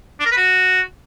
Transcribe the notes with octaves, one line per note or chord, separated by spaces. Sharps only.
D4
A#4
B4
F#4